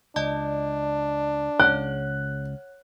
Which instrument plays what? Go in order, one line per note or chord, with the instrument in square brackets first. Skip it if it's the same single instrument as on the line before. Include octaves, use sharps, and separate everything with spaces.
[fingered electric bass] C#2 [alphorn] D4 [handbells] D5 D#5 A5
[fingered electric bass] C#2 C#3 [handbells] C#5 F#5 [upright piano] F#6